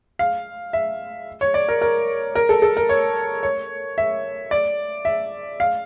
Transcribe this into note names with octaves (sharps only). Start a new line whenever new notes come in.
F5
E5
C#5
D5
A#4
A#4
A#4
A4
A4
A#4
C#5
C#5
E5
D5
E5
F5